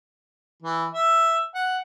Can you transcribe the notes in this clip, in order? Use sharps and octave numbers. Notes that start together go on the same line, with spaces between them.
E3
E5
F#5